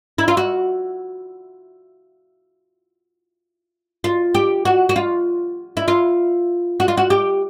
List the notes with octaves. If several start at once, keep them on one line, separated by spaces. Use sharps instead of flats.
E4
F4
F#4
F4
G4
F#4
F#4
F4
E4
F4
F#4
F4
F#4
G4